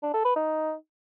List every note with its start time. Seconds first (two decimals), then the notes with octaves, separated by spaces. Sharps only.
0.03 D4
0.14 A4
0.25 B4
0.36 D#4